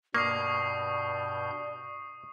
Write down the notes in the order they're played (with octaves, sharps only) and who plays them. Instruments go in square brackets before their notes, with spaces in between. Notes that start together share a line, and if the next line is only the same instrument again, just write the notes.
[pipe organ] G2 B2 G6 [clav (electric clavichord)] A#3 [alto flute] D5 [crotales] C#6 D#6 C7